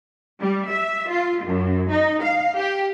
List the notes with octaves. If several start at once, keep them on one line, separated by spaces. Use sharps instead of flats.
G3
E5
F4
F#2
D#4
F5
G4